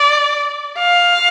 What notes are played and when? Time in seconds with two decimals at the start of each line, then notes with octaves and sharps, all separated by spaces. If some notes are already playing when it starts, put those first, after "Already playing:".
Already playing: D5
0.78 F5